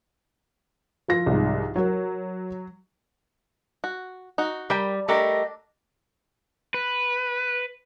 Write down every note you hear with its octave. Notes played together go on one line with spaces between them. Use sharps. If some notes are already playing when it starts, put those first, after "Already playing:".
F3 F4 A#6
C2 G#2
F#3 F#4 A#4
F#4
D#4 F#4
G3 A#4 G5 B5
A3 D4 G4 A#4 D#5
B4